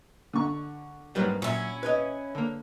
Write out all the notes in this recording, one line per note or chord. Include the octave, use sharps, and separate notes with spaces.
D3 C#6
F2 G#2 F#3 G3 A#3 B4
A#2 F#3 C#4 E4
B4 C#5 D#5
D3 A#3